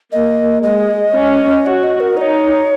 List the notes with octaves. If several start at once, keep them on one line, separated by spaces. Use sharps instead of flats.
A#3 D#5
G#3 D#5
C#4
F#4 C#5
D#5
A#4
D#4 C#5 D#5